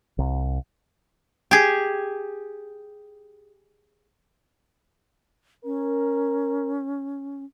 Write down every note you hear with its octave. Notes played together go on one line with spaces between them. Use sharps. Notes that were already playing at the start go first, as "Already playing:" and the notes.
C2
G4 G#4
C#4 A#4